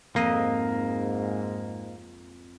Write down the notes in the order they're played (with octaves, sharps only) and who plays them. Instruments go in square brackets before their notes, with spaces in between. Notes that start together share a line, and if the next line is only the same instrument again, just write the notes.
[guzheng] F2 D#5 [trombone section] G#2 [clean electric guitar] A#3